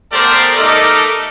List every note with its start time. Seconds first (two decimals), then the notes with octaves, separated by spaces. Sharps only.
0.13 A3 B3 G4 A#4 C5 D5
0.56 A3 D#4 A4 A#4 D#5 D6